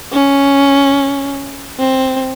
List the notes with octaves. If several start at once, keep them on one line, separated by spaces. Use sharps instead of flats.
C#4
C4